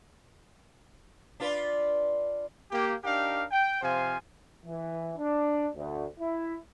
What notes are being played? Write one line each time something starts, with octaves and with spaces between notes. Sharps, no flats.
D4 F4 B4
A#3 G4
D4 D#4 G4 A#4 F5
G5
C3 F3 C5 F5 G#5
E3
D4
D2
E4